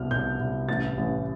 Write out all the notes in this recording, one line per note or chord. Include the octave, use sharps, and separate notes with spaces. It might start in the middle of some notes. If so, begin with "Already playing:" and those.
Already playing: C2 B2 F6
C2 G6
C2
A1 A6
A1